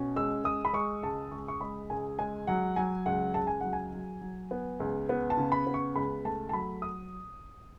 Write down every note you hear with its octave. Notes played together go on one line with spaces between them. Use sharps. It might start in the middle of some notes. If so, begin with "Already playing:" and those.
Already playing: B2 C#4
G#3 E6
G#3 D#6
B5
G#3 C#6
C#2 A5
C#2 C#6
C#6
G#3 B5
C#2 G#5
G#3 G#5
F#3 F#5
F#3 G#5
C#2 F#5
C#2 A5
G#5
F#3 F#5
G#5
F#3
F#3
B3
C#2
B3
A5
C#3
B5
B3
C#6
C#2 B5
A3 A5
A5
F#3 B5
D#6